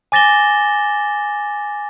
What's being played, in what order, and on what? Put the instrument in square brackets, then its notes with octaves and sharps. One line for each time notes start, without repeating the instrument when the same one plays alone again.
[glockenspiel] G#5 D6 A6 A#6 E7 G7